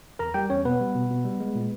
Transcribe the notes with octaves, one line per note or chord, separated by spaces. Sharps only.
E2 A#4 A#5
G3 G4 G5
E2 C#4 C#5
B2 B3 B4
G3
B2
B2
G3
G#3
A#2